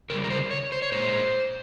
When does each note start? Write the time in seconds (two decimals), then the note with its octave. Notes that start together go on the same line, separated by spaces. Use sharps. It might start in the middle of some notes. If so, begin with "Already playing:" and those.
0.10 C#3 G3 A#4
0.24 A#4
0.30 C5
0.51 C#5
0.72 C5
0.82 C#5
0.92 A#2 G#3 C5